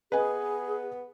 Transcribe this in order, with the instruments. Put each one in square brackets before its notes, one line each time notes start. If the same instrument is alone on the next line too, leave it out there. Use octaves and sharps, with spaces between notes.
[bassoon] B3 [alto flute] G#4 [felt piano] B4 D#5 G#5